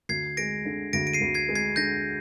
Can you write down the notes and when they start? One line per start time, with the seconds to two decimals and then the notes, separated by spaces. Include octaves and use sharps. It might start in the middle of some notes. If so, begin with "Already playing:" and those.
0.09 D2 G#6 C7
0.37 G#3 A#6 D7
0.65 D3
0.93 D2 A#6 D7
1.07 D7
1.13 C7 D#7
1.21 D2
1.34 G#6 C7
1.49 G#3
1.55 G#6 C7
1.76 D3 G6 A#6